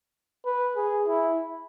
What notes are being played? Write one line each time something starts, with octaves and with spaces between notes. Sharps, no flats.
B4
G#4
E4